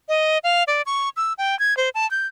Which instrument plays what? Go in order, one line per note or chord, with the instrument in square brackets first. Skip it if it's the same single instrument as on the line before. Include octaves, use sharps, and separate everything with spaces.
[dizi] D#5
F5
D5
C#6
E6
G5
G#6
C5
A5
G6